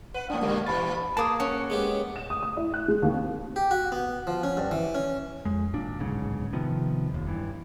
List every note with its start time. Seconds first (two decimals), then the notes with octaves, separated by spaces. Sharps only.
0.14 B4 F#5
0.30 G#2 F3 A#3 D4 D#6
0.42 G2 A#2 D3 G#3 A#3 G4
0.66 G2 A#2 E3 B5 A6
1.17 A#3 G#4 A5 D6 D#6
1.40 C#4 F#5
1.70 G#3 B3 G4
2.16 E7
2.30 D#6
2.43 D#6
2.57 E4
2.74 F#6
2.88 G#3
3.02 D#2
3.14 C4
3.56 G4
3.71 F#4
3.92 B3
4.27 F3
4.43 C#4
4.57 G2
4.71 E3
4.95 C#4
5.45 F2 G#3
5.74 G#1 A#2 D4
5.99 D1 B1 G#2 C#3
6.53 C3 D#3 F3 B3
7.10 F1 D#2
7.26 G2 E3